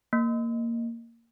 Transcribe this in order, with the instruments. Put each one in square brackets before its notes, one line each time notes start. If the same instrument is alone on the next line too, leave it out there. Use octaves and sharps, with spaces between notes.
[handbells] A#3